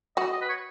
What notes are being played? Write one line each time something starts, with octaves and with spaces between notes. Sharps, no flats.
F#3 F#4 D#5
D#5
B4
C#5